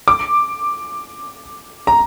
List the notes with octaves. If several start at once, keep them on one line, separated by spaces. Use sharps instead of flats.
D6
A#5